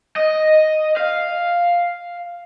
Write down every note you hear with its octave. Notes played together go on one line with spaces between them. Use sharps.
D#5
F5